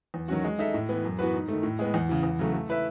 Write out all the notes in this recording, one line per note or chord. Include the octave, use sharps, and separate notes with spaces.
E2
D#3 F#3 C#4 F#4
G#3
D#4 A4 E5
A2
E3 B3
F#2
E3 B3 F#4 B4
G#2
D#3 A3
A2
G#3 B3
E2
C#3 E3
E2
C#3 F#3 A3
A3
E4 B4 E5